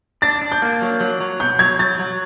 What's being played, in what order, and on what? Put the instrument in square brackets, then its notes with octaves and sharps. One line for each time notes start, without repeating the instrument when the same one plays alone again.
[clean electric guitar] D4 [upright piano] A6
[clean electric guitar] D4
[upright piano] G6
[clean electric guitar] A#3
F#3
F#3
F#3
[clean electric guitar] B2 [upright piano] G6
[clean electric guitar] F#3 [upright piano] G#6
[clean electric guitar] F#3 [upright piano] A6
[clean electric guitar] F#3